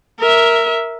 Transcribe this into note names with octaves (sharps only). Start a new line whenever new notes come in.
A#4 E5